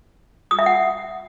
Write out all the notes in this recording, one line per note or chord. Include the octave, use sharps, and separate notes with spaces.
D#6
E5
F#5